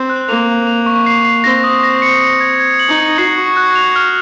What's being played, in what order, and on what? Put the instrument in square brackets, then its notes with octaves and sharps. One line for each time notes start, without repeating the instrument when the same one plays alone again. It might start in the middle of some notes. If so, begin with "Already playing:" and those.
Already playing: [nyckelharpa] C4
[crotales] F#6
[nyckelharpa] A#3 [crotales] F7
[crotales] F7
F7
C#6
C7
C7
[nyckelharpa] C4 [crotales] A#6
[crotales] D#6
A#6
C#7
C#7
G#6
G#6
F#7
[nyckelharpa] D#4
[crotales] G#6
[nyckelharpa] F#4 [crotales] C7
[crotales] C#6
F#6
F7
F6